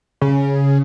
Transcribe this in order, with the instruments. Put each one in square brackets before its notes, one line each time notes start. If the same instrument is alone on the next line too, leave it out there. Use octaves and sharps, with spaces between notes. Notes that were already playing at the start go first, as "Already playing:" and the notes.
[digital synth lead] C#3